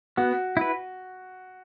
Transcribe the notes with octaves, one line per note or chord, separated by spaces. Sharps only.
B3 F#4
E4 B4